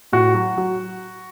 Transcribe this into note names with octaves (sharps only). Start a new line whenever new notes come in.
A2 F#4
F#3
F#3